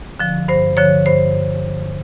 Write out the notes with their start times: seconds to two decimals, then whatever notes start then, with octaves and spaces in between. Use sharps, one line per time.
0.20 D3 F3
0.48 G2 C5
0.77 D3 F3 C#5
1.06 G2 C5